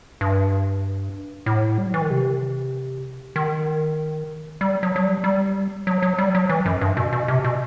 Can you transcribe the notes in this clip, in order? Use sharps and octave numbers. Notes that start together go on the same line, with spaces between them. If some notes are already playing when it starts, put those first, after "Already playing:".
G2
A2
G3
F#3
E3
D#3
C3
D#3
G3
F#3
F#3
G3
G3
F#3
F#3
G3
F#3
E3
F#2
G2
B2
B2
C3
B2